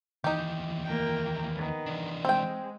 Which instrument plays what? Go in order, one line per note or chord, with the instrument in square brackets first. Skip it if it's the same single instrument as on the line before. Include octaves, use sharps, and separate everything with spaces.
[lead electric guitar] D#2 E3 [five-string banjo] D#4 G4
[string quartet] A#3 A#4 G5
D#3 B3
[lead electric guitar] E3 D4
[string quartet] G#3 [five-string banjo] C4 G5